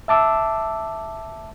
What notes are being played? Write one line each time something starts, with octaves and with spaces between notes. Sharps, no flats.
E5 A5 D6 E6